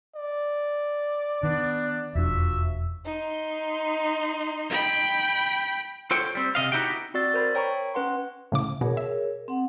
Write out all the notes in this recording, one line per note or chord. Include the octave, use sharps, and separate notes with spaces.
D5
D#3 B3 D4
E1 F2 F3 D4 F#4 E5
D#4 C6
G5 B5
F4 A4 C5 C#5 G5
G3 C4
C3 D#5 F5
B3 D#4 E4 F#4 G4 G5
C4 F#4 D5 E6 A6
A#4 C5 B5
C#5 G5 A#5 B5 C#6
C#4 B4 F#5 C6
A2 C#3 D6
B2 G#4 A#4 C#5
E5
C4 F#5